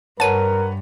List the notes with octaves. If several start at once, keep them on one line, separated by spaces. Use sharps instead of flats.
G2 A#4 B4 C#5 F#5 A5 D#7